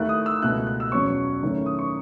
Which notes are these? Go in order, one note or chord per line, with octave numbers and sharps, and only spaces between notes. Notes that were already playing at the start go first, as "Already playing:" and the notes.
Already playing: D#2 D#3 A3 E4 F#6
D#6
E6
C#2 B2 A3 E4 F#6
F#6
E6
E2 B2 F#3 C#4 C#6
F#2 D#3 A3 C#4 E4
D#6
C#6